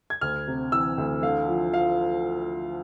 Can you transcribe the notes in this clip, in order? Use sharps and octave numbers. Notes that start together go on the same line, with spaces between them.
G#6
D2 F6
C3
E3 E6
D2
D3 F5
F3
F3 F5